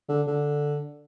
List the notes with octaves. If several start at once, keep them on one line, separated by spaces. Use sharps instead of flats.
D3
D3